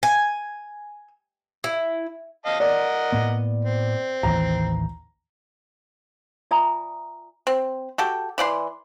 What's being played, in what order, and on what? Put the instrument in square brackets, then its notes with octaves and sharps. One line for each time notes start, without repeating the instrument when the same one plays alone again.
[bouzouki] G#5
E4
[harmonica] D#5 F5 A5
[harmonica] A#4 D#5 F#5 [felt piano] D5
[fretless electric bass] A2 A#3 B3
[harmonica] C4
[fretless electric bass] A1 D#2 E3 [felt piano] A#5
[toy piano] F4 D5 E5 G#5 A#5 D#6
[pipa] C4
F#4 G4 A4
E3 D5 F#5 C6